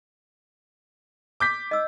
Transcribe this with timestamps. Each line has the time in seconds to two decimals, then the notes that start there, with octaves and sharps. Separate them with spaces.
1.40 D6 G6 B6
1.71 D#5 E6